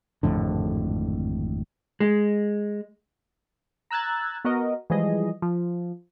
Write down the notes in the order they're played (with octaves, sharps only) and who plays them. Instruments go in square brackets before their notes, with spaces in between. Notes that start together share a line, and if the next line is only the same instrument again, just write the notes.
[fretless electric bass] G#1 F2 A2 D3
[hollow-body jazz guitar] G#3
[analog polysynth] A#5 E6 F#6 G#6 A6
B3 F#4 A#4 D#5
E3 F3 G3 G#3 G#4 D#5
F3